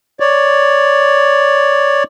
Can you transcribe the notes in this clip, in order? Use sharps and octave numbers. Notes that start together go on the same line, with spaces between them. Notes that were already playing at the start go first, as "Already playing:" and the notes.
C#5 D5